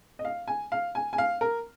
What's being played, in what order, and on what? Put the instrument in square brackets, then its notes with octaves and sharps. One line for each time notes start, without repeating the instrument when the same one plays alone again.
[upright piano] D#5
F5
G#5
F5
G#5
G#5
F5
A#4